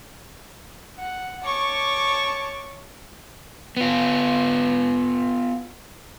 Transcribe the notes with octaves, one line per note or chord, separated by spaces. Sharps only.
F#5
C#5 A5 C#6 D6
B3 F4